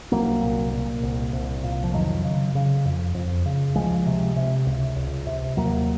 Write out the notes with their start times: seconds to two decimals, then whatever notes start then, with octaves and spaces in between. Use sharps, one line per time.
0.12 C2 F#3 A#3
0.42 A#2
0.73 A#2
1.03 C2
1.33 C2
1.63 A#2
1.84 F3
1.94 F2 D#3 F#3
2.24 C#3
2.55 C#3
2.85 F2
3.14 F2
3.46 C#3
3.75 C#2 F3 G#3
4.06 C3
4.36 C3
4.66 C#2
4.96 C#2
5.27 C3
5.57 D#2 F#3 A#3